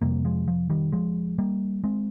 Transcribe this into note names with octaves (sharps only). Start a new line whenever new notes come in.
F2 C3 G3 A#3
F3 G#3
F3
D#3 G3
F3 G#3
G3 A#3
G#3 C4